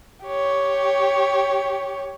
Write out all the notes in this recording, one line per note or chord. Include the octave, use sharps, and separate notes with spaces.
G4 C#5